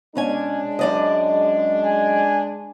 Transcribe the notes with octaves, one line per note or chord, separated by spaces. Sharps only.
B2 G#3 C#4 D4 G#5
F#2 D5 D#5
G#5